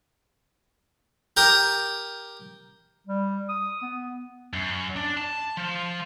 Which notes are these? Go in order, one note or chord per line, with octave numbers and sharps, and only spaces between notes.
G4 A#4 G5 D#6
G3
D#6
B3
F#2
D4
A5
F3